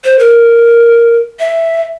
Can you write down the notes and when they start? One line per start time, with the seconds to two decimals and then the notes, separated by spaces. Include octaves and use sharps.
0.04 C5
0.19 A#4
1.40 E5